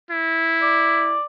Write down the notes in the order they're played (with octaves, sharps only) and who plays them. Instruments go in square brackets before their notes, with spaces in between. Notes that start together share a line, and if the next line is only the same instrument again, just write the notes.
[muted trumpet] E4
[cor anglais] D5